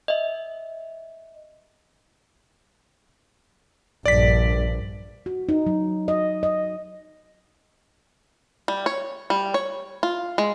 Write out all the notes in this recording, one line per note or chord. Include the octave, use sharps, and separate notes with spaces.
D#5 E5
A#1 G2 D5 B6
F#4
D#4
F#3
D#5
D#5
G3
C#5
G3
C#5
F4
G#3